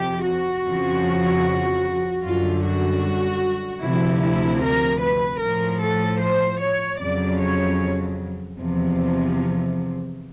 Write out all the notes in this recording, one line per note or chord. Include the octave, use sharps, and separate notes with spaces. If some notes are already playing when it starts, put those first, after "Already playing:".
Already playing: F2 C3 F3 G4
F#4
F2 C#3 F3
F#2 D3 G3 F4
F#4
D2 C3 F3 E4
E4
A#4
B4
A2 F3 A#4
A4
C5
C#5
F2 C#3 F#3 D5
C#5
E2 C3 F3